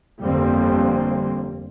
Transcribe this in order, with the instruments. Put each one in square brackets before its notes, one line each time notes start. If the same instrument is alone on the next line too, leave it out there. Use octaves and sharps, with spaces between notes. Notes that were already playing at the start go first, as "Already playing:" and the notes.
[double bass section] G1 F2 G3 A#3 C4